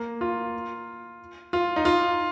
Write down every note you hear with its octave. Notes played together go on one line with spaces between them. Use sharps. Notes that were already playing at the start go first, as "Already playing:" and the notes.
Already playing: A#3
F4
F4
D#4
F4